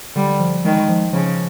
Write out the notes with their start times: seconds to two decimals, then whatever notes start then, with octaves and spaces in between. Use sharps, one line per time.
0.15 D3 G3
0.40 F3
0.64 D#3 G#3
0.89 F3
1.13 C#3 F3